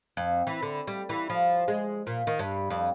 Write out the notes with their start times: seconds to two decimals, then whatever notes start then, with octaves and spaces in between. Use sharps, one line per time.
0.17 F2
0.47 E3
0.62 D3
0.87 G3
1.09 E3
1.30 F3
1.68 G#3
2.07 A#2
2.27 D#3
2.39 G2
2.70 F2